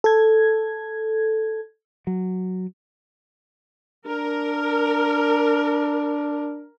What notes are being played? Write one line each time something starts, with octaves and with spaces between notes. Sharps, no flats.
A4 G#6
F#3
D4 A#4